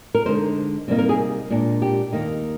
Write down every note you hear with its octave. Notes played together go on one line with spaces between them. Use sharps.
A#4
D3 G#3 D#4 C5
C3 G3 A#3 D#4
A#4
G#4
A#2 G#3 D4
G4
D#2 D#3 A#3 D#4